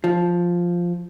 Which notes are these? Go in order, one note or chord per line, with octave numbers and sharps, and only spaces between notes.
F3